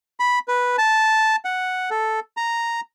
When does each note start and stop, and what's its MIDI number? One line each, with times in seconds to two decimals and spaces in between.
0.20 0.39 83
0.48 0.76 71
0.78 1.36 81
1.45 1.90 78
1.91 2.20 69
2.37 2.81 82